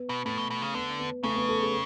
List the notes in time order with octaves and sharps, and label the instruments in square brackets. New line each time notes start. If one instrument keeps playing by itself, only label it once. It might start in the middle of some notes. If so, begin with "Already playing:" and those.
Already playing: [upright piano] B3
[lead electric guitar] B2
[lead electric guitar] A2 [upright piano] A3
[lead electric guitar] B2
B2
C#3
[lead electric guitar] D3 [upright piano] B3
[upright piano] B3
[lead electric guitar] C#3 [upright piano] A3
[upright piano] B3
A4
G#4